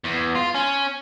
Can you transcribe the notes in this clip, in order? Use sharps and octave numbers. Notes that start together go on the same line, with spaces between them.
E2
F4
C#4